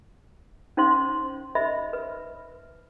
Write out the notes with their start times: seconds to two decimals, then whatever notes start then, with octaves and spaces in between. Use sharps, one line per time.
0.77 C#4 D#4 C5 F5 C6
1.55 C5 D#5 E5 B5
1.93 B4